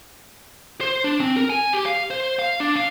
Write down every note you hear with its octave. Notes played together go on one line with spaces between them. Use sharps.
C5
D4
C4
A#4
G#5
G4
F5
C5
F5
D4
F5